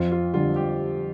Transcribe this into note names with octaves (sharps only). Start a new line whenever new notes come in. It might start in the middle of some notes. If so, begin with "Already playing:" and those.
Already playing: F2 F4
F4
D3 G3 F4
G4